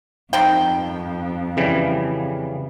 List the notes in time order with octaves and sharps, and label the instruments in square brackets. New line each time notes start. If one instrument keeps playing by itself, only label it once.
[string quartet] F2 [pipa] D#3 C4 G5
[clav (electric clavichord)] C#3 E3 G3